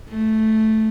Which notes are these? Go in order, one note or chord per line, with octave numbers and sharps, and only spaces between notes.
A3